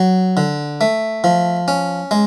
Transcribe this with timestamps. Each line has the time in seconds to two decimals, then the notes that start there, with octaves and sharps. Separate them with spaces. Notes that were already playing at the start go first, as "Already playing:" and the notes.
Already playing: F#3
0.37 D3
0.81 A3
1.24 F3
1.68 C#4
2.11 G#3